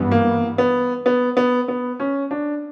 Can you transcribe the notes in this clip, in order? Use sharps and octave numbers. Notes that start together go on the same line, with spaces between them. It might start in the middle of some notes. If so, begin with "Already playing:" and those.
Already playing: G2 E3 B3
A#3
B3
B3
B3
B3
C#4
D4